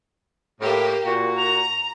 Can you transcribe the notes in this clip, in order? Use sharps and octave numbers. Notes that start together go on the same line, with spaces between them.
A2 A#3 G4
A#2 F#4
A#5 F7